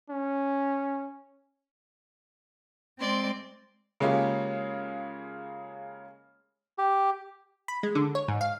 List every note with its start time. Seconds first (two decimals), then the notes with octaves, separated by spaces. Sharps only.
0.10 C#4
3.00 G#3 C4 D5 C6
4.00 C#3 G#3 A#3 C#4 F4 G4
6.78 G4
7.68 B5
7.83 G#3
7.95 D3
8.15 C#5
8.28 G#2
8.41 F5